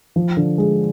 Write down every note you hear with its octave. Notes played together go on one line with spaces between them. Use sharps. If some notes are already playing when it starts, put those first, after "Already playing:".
F3
D3
G#3